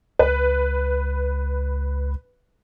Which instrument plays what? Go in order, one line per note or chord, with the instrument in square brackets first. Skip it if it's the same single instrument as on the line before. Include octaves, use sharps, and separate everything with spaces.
[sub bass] C#2 [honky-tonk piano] B4